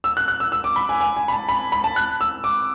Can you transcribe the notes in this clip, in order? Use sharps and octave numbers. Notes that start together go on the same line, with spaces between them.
E6
F#6
F#6
E6
E6
D6
B5
G#5
G#5
G#5
B5
A5
B5
B5
A5
F#6
E6
D6